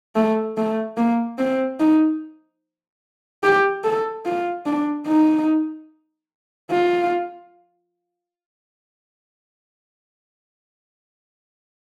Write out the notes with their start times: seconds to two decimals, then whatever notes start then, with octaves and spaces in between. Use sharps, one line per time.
0.16 A3
0.57 A3
0.97 A#3
1.39 C4
1.80 D#4
3.43 G4
3.84 A4
4.26 F4
4.66 D4
5.07 D#4
6.71 F4